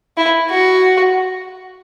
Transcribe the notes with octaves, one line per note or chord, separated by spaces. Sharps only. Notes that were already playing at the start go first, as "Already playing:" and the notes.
E4
F#4